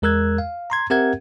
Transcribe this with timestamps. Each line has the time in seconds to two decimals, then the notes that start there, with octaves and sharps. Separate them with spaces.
0.02 E2 G#3 A#4 E6 F#6 G#6
0.38 F5
0.70 A#5 C6 G#6
0.90 C4 G4 A#4 E5 F#5 G#6